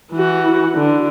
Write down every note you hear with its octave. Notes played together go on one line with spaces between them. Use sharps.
E3 F#4
D3